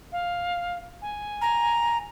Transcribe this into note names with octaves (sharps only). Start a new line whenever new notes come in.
F5
G#5
A#5